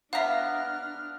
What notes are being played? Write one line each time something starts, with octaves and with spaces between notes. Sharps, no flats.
B3 D4 E5 F5 A#5 F6